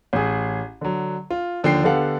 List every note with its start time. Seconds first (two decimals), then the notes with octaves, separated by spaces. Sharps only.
0.13 A1 G#4
0.81 D3 F#3
1.30 F4
1.63 D#2 D3 F3 G5 C7
1.84 D3 B3 G4 A4 F5 F#5